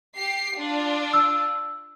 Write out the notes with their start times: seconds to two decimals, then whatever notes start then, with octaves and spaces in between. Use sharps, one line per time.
0.16 G4 C7
0.56 D4 F4
1.13 E6